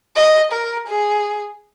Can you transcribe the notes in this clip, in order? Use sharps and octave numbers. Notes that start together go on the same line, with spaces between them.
D#5
A#4
G#4